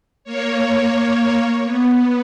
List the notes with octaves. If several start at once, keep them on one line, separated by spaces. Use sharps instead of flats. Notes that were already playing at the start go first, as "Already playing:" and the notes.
A#3 C#5
B3